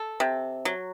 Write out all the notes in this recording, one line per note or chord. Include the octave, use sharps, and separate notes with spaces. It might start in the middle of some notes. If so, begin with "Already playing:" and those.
Already playing: A4
C3
F#3